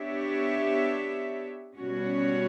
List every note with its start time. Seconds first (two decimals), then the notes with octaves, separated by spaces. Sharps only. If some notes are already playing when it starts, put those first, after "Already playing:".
Already playing: B3 D4 G4 C#5 E5
1.76 B2 G3 C#4 F#4 C#5